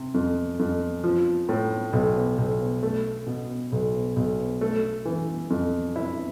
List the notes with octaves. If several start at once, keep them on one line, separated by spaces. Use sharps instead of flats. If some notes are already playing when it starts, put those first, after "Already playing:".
Already playing: C3
F2
F2
F3
A2
B1
B1
A3
B2
B1
B1
A3
E3
F2
E4